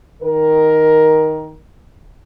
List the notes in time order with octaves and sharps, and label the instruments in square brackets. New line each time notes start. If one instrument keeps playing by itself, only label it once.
[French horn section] D#3 A#4